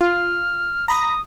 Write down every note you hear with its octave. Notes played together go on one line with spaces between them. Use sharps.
F4 F6
A#5 B5 D#6 A#6